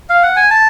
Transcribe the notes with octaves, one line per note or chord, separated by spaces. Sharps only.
F5
F#5
G#5
A5